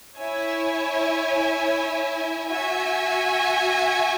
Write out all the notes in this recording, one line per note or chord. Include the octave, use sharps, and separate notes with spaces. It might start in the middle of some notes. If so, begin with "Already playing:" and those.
E4 C#5 E5 G#5
F#4 E5 G#5